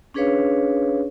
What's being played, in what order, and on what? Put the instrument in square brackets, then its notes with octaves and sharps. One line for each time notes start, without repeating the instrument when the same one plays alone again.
[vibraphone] C#4 D4 G#4 B4 C#5 F5